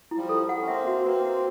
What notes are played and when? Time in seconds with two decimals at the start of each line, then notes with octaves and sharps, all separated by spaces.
0.11 E4
0.16 F3 G3
0.29 A4
0.49 F#5
0.61 C#4
0.68 A#3 C4 E5
0.87 F#4
1.06 A#3 C4 B4
1.25 F#4